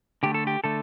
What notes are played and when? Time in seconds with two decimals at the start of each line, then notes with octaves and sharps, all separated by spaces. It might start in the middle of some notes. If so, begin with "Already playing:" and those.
0.23 D3 A3 G4
0.34 A4
0.47 G4
0.64 D3 A3 A4